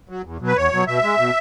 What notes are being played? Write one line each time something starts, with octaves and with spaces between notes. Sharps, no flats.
F#3
E2
B2 F#3
B4
E2 C#5
B2 F#3
B2 E5
G#3
B2